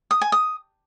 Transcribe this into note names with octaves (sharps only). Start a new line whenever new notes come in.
D#6
G#5
D#6